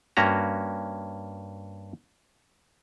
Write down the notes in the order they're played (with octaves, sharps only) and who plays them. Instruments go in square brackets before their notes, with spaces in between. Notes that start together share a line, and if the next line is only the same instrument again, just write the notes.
[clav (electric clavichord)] G2 A#3 C#4 F#4 A#5